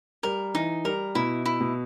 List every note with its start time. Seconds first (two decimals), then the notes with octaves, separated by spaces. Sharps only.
0.23 G3 A#4
0.54 E3 D#4
0.85 G3 A#4
1.15 B2 E4
1.46 E4
1.61 B2